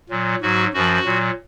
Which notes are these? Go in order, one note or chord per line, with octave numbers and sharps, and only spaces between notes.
A#2 F#3
G#2 F#3 F#4
F#2 F3 F#4
A#2 F#3